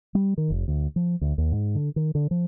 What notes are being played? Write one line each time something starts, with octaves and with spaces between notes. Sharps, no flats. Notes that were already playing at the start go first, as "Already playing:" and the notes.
G3
D#3
F1
D2
F3
D2
D#2
G#2
D3
D#3
D3
F3